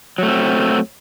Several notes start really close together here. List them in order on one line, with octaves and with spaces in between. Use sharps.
F#3 A3 C4